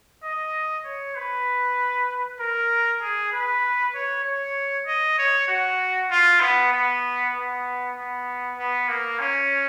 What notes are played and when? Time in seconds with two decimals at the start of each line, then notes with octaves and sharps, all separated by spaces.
0.23 D#5
0.85 C#5
1.16 B4
2.40 A#4
3.01 G#4
3.32 B4
3.95 C#5
4.24 C#5
4.86 D#5
5.18 C#5
5.48 F#4
6.11 F4
6.41 B3
6.73 B3
7.35 B3
7.96 B3
8.58 B3
8.88 A#3
9.20 C#4